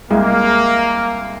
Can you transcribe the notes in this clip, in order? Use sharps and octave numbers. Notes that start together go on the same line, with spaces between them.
C2 G#3 A#3